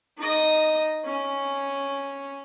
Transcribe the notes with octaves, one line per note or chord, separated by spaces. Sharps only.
D#4 D#5
C#4